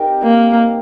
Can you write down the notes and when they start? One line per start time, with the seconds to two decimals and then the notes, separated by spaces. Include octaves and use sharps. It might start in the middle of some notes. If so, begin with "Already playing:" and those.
Already playing: C4 D#4 G4 A#4
0.23 A#3